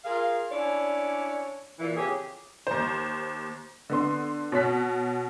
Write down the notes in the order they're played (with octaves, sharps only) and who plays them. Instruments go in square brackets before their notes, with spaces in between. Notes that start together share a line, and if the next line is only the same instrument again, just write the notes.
[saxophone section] F4 G#4 A#4 F5
C#4 D4 E4 C#5 D5
A#2 E3
F2 C#3 G4 G#4
[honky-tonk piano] D#2 C5
D3 B3 C6
B2 C#5 F#6 B6